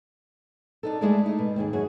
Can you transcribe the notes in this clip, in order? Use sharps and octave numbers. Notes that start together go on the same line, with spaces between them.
D4 D#4 A4
G#3 A3 E4 G#4 A4 D5
D#4
B2
D#2 G#2 G#4
F#2 F#4 G#4